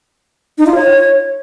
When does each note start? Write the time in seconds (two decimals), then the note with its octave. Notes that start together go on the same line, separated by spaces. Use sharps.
0.58 D#4
0.66 F4
0.75 C#5